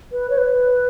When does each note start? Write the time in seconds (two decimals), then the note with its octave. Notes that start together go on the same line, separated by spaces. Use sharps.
0.12 B4
0.30 C#5
0.38 B4